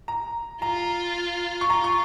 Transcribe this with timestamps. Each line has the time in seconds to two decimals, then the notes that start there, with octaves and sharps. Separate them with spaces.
0.08 A#5
0.62 F4 A#5
1.61 C#6
1.70 F4 A#5
1.84 C#6